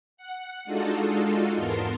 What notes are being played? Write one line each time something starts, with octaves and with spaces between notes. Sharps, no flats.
F#5
G#3 D4 D#4 F4 F#4 A4
E2 G#2 B3 A#4 A5 C6